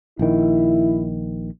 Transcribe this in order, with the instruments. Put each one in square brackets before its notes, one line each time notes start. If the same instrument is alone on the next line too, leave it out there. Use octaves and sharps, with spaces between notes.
[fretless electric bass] A#1 D#3 [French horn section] E4